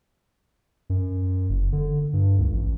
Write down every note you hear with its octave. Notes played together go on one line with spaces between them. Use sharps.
F#2
F#1
D3
G2
C#2
A1